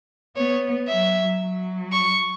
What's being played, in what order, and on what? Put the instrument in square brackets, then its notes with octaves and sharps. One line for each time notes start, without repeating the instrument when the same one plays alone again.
[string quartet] B3 [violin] C#5
[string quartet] F#3 [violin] E5
[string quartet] F#3
[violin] C#6